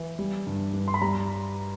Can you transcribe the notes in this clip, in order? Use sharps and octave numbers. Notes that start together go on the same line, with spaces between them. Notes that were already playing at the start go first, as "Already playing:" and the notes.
Already playing: E3
G3
G2
G2
C6
B5
G3 A#5